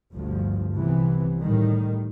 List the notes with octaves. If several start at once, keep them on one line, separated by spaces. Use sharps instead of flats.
G1 D2 G2 F3
C2 C3 E3 B3
A2 D#3 G3